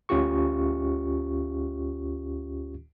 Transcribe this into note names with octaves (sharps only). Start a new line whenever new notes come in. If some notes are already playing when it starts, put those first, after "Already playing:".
D2 C#4 F4 G4 C#6